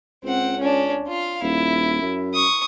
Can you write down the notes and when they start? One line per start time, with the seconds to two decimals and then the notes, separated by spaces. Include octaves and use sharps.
0.24 C#2 C4 F#5
0.60 C#4 D4
1.07 F4 F5
1.42 D#1 E4
2.02 F#2
2.34 C#6 D#6